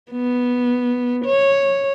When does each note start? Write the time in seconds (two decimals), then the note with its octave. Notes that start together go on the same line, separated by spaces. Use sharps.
0.12 B3
1.25 C#5